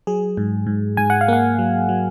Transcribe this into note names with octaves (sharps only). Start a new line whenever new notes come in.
F#3 G#4
G#2
G#2
G#2 G#5
F#5
F5
A#3 F#5
F#3
F#3